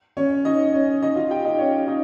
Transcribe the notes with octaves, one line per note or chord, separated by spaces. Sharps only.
C#4 C#5
D#4 D#5
C#4 C#5
D#4 D#5
F4 F5
G4 G5
D#4 D#5
C#4 C#5
D#4 D#5